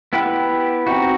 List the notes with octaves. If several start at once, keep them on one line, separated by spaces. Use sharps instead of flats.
B3 E4 G4 B4
C4 D#4 F#4